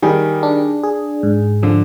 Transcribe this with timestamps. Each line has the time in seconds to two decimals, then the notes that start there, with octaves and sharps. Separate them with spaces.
0.02 D#3 G3 G#4
0.43 D4
0.83 G#4
1.23 G#2
1.63 D3 F3